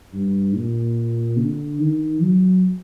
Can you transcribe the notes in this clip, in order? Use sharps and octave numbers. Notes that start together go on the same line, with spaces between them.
G2
A#2
D3
D#3
F#3